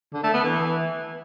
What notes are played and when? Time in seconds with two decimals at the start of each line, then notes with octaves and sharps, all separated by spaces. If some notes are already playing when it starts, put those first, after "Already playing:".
0.13 D3
0.23 A3
0.34 B3
0.44 E3